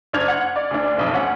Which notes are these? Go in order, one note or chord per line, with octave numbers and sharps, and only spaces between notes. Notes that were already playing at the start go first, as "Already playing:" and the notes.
F#1 D4 F6 G#6 F7
F#5
D5
D2 D4
F#1 B1 F2
D2 C#4 F#5